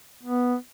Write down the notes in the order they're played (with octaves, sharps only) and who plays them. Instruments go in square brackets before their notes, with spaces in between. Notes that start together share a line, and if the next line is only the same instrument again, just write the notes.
[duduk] B3